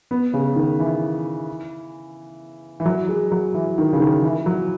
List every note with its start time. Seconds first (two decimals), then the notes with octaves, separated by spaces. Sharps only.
0.11 B3
0.34 C#3
0.56 D#3
0.80 E3
2.80 E3
2.85 F#3
3.09 G#3
3.32 F#3
3.55 E3
3.78 D#3
3.93 C#3
4.00 D#3
4.23 E3
4.46 F#3